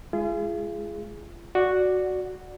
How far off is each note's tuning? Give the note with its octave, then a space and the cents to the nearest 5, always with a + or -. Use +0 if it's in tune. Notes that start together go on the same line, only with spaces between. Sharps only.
G#3 +0 F4 -40 G#4 +0
F#4 +0 D5 +0